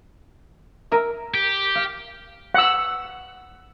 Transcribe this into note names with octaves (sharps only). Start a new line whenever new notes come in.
A#4 E5
G4
F5
F#5 E6